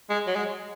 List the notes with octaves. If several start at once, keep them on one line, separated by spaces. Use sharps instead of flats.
G#3
F#3
G#3